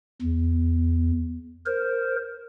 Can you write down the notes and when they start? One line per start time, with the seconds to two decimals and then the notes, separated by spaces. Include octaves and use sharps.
0.22 E2
1.66 A#4 C5